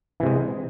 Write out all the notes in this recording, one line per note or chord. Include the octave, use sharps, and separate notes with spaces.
C3 E3 G#3